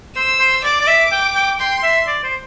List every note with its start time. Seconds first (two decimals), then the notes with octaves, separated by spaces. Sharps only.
0.16 C5 E6
0.39 C5
0.64 D5 D6
0.81 D5
0.87 E5
1.12 G5
1.36 G5
1.59 G5 C6
1.83 E5
2.07 D5
2.24 C5